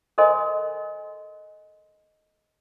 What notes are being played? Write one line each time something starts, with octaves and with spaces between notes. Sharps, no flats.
A4 A#4 C5 D#5 G#5 C6